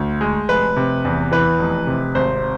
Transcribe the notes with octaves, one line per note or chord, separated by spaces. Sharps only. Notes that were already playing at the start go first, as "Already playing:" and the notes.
Already playing: D2
G#3
F1 B4
C3
E2
E3 B4
F1
C3
G#1 C5